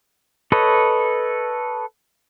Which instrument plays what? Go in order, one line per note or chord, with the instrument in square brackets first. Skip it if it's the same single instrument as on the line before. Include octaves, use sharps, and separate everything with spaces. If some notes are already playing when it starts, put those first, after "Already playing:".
[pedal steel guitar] A4 B4 C#5 D#5